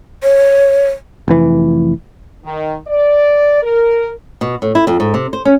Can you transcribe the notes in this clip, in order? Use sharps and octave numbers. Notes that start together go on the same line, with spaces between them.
C#5
F1 E3
D#3
D5
A#4
B2
A2
E4
F2
G#2
C3
C5
C#4